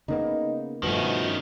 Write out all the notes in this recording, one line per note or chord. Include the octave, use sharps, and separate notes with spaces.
C#3 A#3 B3 D#4
G2 B2 D#3 F3 A3 C#4